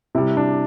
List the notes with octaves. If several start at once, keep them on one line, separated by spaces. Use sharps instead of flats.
C3 G3 E4
D4